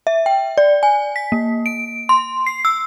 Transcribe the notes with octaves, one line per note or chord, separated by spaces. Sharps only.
E5
G5
D5
G#5
B6
A#3
D7
C6
C7
E6